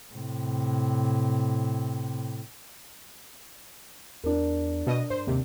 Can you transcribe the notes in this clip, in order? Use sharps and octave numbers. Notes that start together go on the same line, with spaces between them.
A2 C3
E2 D4 A#4
B2 D#5 D#6
G2 C5
D#2 C3